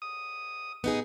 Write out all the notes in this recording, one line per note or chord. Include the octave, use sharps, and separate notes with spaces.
D#6
B3 D#4 G#4